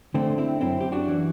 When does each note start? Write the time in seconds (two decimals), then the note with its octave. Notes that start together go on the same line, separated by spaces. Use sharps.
0.14 D3 A3 C4
0.38 C4 E4
0.61 F#2 C4 E4
0.81 G4
0.92 D4 F#4
1.08 E3